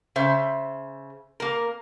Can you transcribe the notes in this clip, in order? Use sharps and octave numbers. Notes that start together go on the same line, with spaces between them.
C#3 C5 E5
A#3 A#4